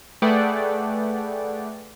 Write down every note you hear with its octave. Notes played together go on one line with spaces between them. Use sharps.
A3 G#4 B4 D5 F#5 G5